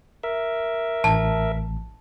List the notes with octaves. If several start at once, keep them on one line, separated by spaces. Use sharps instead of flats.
A#4 E5
A1 A5